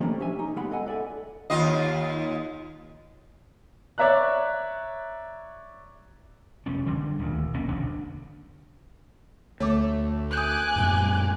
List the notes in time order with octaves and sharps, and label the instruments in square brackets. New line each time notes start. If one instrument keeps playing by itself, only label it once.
[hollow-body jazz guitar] F3 G3 A3 A#3 C#4 D4
C#4 G4 E5 G#5
D#4
C#2 G#3 B3 G4 F#5 B5
A4 D#5 F#5 G#5
A4 D5 E5 G#5
[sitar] D#2 F4 D#5
[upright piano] C#5 D5 E5 A#5 F#6
[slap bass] F1 G3 C#4
D3 G3 G#3 D4
D#1 D2
A#1 B2 A#3 C#4
E1 D#2 D3 D4
[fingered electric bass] D2 [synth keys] A3 [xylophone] C#5 D6
[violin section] G#5 D6 F#6 [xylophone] D#6 G6
[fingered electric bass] F#2 A#2 G3